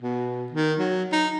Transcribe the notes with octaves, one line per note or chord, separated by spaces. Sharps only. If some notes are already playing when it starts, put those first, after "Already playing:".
B2
D#3
F#3
D#4